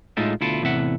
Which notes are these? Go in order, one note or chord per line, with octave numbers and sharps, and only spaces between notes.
A2 G#3 D#4 F4 A4 E5
D2 B2 E4 F4 A4
E2 A2 C3 E5 F#5